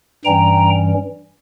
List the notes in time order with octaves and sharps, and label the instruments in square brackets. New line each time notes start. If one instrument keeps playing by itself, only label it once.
[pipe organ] G2 E3 G3 C#4 G5 A#5